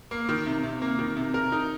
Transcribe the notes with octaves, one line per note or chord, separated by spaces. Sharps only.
A#3
D#3
C3
C3
A#3
D#3
C3
A#4
D#4